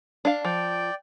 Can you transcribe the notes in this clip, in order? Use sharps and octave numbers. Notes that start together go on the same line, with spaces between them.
D4 F5
F3 D5 G5